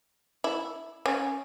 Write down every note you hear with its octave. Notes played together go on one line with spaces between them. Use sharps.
E4
C#4